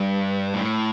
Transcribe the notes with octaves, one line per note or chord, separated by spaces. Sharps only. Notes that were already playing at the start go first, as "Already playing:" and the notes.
Already playing: G2
A2